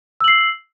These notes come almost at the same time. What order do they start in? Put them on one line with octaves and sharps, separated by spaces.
E6 F#7 C7